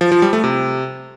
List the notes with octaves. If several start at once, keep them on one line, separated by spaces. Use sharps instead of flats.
F3
F3
G3
A3
C3